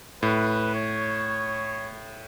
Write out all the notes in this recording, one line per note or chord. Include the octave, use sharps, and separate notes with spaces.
A2 B4
C#5